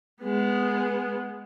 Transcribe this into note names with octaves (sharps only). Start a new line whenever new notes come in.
G#3 B3